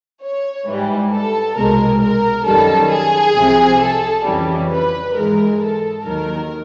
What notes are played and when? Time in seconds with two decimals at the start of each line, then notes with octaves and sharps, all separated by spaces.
0.22 C#5
0.67 G#2 E3 G3
1.11 A4
1.56 C2 B2 G#3 A#4
2.01 A#4
2.45 F#2 D#3 G3 A4
2.91 G#4
3.35 C2 C3 F3
3.81 A4
4.25 F2 C#3 E3 G3
4.70 B4
5.15 G#2 E3 G#3 A#4
5.60 A4
6.05 D#2 D#3 F#3 A#4